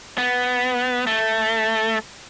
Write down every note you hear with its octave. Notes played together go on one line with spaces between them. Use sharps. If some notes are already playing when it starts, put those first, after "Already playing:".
B3
A3